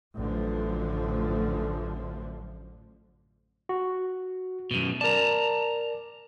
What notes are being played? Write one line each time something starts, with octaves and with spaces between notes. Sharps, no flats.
A1 F#2 D3 F3 A3
F#4
F#2 B2
A#4 D5 A5 A#5